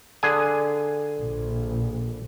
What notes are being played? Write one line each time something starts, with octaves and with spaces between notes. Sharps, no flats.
D3 G#4 G#5
A#1